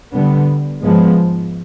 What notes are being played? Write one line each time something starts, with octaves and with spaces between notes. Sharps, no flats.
D3 G3 B3
G#2 F3 G#3 B3